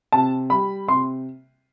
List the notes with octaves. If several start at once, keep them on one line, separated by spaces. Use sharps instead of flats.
C3 A5
G3 B5
C3 C6